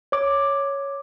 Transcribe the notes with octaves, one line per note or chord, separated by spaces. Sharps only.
C#5 D6